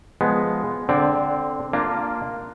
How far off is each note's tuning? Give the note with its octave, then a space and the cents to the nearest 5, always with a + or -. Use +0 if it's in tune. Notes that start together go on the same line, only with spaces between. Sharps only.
F3 +0 G#3 +0 B3 +0
D3 +0 C4 +0 D5 -20
A#3 +0 D4 +10 F4 -10